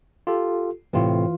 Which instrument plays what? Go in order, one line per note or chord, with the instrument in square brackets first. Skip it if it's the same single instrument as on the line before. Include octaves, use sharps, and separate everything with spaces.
[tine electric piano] F4 G4 A4
[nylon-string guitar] A2 C3 [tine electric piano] E3 F4